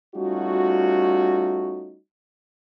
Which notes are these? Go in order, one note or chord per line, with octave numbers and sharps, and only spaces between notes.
G3 A3 C#4 D#4 F4 F#4